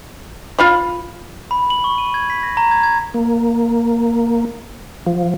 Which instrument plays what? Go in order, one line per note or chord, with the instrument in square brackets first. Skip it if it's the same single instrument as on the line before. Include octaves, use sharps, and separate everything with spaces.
[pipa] F4 F5 B5
[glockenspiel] B5
F#7
C#6
D#7
G#6
B6
A#6
A#5
G#6
G#6
[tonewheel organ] A#3
F3